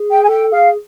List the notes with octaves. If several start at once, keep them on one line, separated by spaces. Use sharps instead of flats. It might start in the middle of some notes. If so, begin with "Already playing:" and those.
Already playing: G#4
G5
G#5
A4 G5
G#4 F5